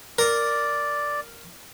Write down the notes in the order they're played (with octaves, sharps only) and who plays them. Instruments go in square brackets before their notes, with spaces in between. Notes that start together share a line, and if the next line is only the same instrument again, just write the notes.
[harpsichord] A#4 [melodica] D5